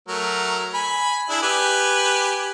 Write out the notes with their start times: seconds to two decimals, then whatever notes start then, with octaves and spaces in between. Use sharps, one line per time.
0.08 F#3 A3 A#4
0.74 G#5 B5
1.29 D4 E4 G#4
1.43 G4 B4 G#5